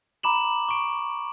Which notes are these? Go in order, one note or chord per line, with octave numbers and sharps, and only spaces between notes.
A#5 B5 D6 E7 F#7
C#6 D7